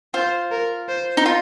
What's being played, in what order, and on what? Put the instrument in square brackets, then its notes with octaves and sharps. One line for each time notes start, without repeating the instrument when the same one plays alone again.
[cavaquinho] F4 [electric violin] C5
[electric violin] A#4
C5
[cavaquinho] D#4
F4